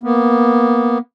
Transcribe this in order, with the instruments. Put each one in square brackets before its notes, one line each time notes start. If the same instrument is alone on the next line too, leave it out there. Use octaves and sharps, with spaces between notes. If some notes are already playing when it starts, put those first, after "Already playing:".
[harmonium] A#3 B3